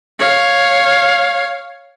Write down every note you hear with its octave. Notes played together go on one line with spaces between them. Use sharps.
C#5 F5